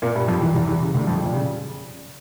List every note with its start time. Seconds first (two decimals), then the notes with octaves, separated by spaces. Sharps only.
0.02 A#2 A#3
0.15 G2 G3
0.28 F2 F3
0.41 E2 E3
0.55 E2 E3
0.68 E2 E3
0.81 C#3
0.94 D2 D3
1.07 F2 F3
1.26 A#2
1.33 C#3